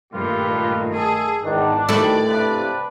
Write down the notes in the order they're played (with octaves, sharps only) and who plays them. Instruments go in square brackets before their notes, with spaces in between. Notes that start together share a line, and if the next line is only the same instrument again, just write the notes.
[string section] G2 A#2 [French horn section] D#3 A3 [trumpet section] F4 G4 B4
[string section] G#4 [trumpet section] A4
[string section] G#1 [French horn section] E2 D#3 [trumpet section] D4
[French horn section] D2 D#3 G3 [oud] A3 E4 [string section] D5
[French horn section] G2 C3 [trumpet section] D4 B4